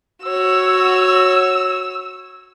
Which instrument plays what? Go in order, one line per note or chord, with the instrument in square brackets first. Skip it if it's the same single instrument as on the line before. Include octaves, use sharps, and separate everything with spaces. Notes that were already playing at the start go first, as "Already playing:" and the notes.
[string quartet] F#4 C#5 [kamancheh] E6